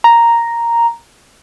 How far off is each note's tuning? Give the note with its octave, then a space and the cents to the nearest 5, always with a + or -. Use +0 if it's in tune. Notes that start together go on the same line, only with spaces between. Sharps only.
A#5 +0